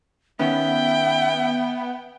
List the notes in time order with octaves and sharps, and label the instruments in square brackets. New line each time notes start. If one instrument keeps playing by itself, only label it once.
[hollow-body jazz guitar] D#3 C#4 [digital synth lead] B3 [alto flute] E5 [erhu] G5